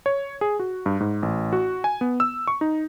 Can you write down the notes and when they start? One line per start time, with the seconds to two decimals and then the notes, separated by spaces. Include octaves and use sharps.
0.06 C#5
0.41 G#4
0.59 F#4
0.86 G2
1.00 G#2
1.23 A1
1.53 F#4
1.84 G#5
2.01 B3
2.20 E6
2.47 C#6
2.61 D#4